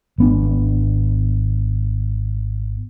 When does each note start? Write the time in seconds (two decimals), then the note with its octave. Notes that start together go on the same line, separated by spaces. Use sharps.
0.18 G#1 B3 D4